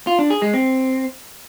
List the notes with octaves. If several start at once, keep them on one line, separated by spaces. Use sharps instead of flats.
F4
D4
G#4
G#3
C4